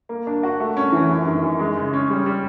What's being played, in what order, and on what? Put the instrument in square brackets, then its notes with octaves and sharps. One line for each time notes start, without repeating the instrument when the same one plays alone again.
[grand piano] A#3
D4
F#4
A3
C#4
E3
F#2
D#3
F#2
G#3
C#3
C#4
G3
G3